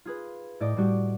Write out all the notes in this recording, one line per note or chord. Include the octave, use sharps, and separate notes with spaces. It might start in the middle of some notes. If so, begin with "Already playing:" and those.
F4 G#4 B4
A2 D5 D#5 G5
A2 G3 F#4 G4